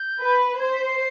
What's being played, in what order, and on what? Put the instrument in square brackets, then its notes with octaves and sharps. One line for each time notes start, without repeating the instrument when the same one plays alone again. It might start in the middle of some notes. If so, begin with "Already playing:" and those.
Already playing: [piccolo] G6
[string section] B4
[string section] C5 [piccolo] G#6
[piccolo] B6
C7